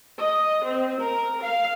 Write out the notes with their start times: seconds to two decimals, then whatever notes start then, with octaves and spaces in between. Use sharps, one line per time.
0.18 D#5
0.65 C4
1.01 A#4
1.42 F5